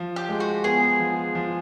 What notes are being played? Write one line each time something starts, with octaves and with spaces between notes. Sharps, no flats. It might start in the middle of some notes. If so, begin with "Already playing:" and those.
Already playing: F3
G4
G#3
F#4
B3 G#4
F3
F3